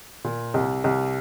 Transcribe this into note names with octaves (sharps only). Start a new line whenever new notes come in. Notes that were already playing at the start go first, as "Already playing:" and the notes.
A#2
C2
C2